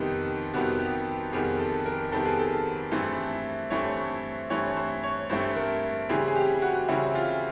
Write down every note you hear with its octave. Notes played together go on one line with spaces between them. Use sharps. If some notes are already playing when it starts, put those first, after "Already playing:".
Already playing: F2 C3 D#3 G3 B3 D#4
F2 C3 D#3 G3 B3 F#4
G4
F2 C3 D#3 G3 B3 G#4
A4
A#4
F2 C3 D#3 G3 B3 A4
G#4
A4
G2 E3 A3 C4
G2 E3 A3 C4 C#5
G2 E3 A3 C4 C#5
C5
C#5
G2 E3 A3 C4 C5
A#4
C#3 E3 G3 C4 G#4
G#4
G4
F#4
C#3 E3 G3 C4 E4
F4